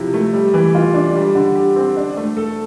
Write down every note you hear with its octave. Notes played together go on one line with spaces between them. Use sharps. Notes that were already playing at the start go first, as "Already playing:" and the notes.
Already playing: C3 F3 E4
A3
G3
E3
F4
D4
G3
D3
G4
C4
D4
A3
A4